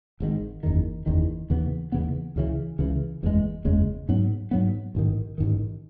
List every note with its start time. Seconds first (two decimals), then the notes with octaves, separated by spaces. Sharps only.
0.20 G#1 G#2 D#3
0.63 F#1 E2 D#3
1.06 F#1 E2 D#3
1.50 D#2 C#3 E3 B3
1.92 D#2 C#3 E3 B3
2.36 C#2 C#3 E3
2.79 C#2 C#3 E3
3.23 F#1 E2 C#3 G#3
3.65 F#1 E2 C#3 G#3
4.09 G#2 F#3 B3
4.51 G#2 F#3 B3
4.95 A1 G#2 D#3
5.38 A1 G#2 D#3